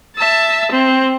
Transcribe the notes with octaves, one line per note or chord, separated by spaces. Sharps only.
E5 A5
C4